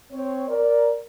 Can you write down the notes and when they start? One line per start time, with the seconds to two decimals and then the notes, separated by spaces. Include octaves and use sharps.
0.12 C4 C#5
0.48 A#4 D5